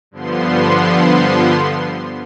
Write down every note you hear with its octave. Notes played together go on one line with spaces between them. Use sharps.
G2 D3 F3 B3 C6